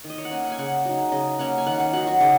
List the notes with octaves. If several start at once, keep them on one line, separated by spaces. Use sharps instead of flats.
D#3
D#5
C#5
F#5
A#3 C#4 G#5
F#5
G#5
C#3 F#5
F#3 D#4
C#3 D#5
A#3 C#4 F#5
G#5
D#3 F#5
F#5
F#3 D#4 F#5
F#4
C#3 D#4